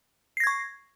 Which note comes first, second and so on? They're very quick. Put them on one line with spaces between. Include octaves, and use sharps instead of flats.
C7 A#6 G#6 C#6